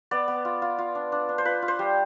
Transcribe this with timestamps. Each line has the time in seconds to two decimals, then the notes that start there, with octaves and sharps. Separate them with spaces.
0.11 B3 D5
0.28 B3
0.45 F4
0.62 F4
0.78 F4
0.95 D4
1.12 D4
1.29 D4
1.38 C5
1.45 F4 B4
1.62 F4
1.68 C5
1.79 G3